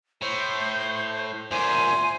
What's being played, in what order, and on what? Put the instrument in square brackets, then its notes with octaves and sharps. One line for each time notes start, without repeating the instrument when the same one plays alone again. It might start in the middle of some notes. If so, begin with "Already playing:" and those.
[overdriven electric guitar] A2 [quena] C5
[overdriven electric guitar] D2 A#2 [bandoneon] C5 [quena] G#5